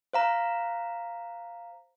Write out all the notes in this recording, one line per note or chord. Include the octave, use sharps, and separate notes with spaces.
C5 F5 A#5